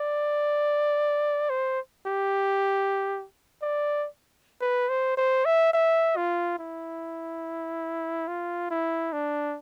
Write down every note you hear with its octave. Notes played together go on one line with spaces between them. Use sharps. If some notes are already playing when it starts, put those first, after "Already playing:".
Already playing: D5
C5
G4
D5
B4
C5
C5
E5
E5
F4
E4
F4
E4
D4